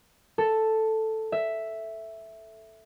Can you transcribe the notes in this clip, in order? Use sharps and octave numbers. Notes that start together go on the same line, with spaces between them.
A4
E5